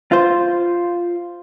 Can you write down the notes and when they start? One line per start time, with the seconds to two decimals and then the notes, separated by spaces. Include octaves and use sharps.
0.12 F4 C5